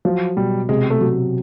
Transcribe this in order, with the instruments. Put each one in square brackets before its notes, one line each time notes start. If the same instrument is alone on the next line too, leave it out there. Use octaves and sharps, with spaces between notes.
[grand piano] F3 [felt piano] F#3
[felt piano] B2 [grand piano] G3
[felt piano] C3 [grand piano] G#3
[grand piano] A3
[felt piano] F#3